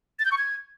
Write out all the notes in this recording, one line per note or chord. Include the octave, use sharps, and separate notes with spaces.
A6
G6
C#6
G#6